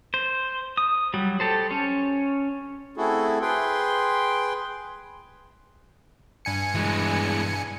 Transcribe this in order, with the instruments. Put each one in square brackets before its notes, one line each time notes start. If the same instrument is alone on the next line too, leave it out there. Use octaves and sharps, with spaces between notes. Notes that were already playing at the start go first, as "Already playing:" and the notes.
[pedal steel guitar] C5
D#6
F#3 G3
G4 A4 C5
C#4 C#5
[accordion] A3 C4 E4 F#4 G#4 A4
G#4 B4 G5 C6
[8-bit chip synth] G2 G#5 C#7
[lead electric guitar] E3 G#3